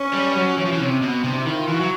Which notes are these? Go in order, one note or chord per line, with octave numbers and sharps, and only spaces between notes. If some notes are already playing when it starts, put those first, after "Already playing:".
Already playing: C#4
G3
F#3
E3
F3
E3
C3
B2
C3 D4
E4
D#3
F4
E3
F#4
F#3